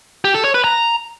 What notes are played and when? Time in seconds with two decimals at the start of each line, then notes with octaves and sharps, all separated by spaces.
0.25 G4
0.35 A4
0.44 C#5
0.54 B4
0.64 A#5